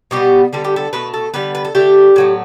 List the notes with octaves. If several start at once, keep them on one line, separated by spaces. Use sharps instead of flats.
B2 G3 B3 G4
D3 G3 B3 A4
G4
A4
B2 A3 B4
A4
D3 G3 B3 B4
B4
A4
D3 A3 G4
A2 F#3 B3